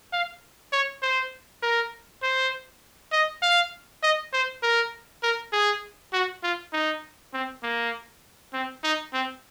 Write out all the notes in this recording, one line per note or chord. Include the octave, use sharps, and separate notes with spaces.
F5
C#5
C5
A#4
C5
D#5
F5
D#5
C5
A#4
A#4
G#4
F#4
F4
D#4
C4
A#3
C4
D#4
C4